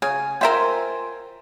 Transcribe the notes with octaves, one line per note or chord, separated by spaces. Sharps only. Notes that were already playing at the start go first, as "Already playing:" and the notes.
C#3 G#5
F4 A#4 C5 E5 G5 G#5